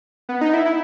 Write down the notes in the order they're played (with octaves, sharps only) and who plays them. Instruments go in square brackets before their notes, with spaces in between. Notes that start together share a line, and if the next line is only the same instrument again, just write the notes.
[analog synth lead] B3
D#4
E4
E4